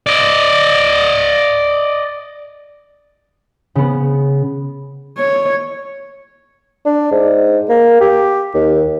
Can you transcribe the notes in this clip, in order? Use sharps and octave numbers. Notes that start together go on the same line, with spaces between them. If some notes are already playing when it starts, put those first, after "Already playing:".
D5 D#5
C#3 B3
C#5
D4
G#2
A#3
G4
D#2